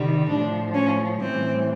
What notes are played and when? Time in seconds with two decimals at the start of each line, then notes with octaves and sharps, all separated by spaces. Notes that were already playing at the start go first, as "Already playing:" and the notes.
Already playing: C3 D#3 G3
0.28 A2 F3 D4
0.74 C#4
1.20 A2 E3 G3 C4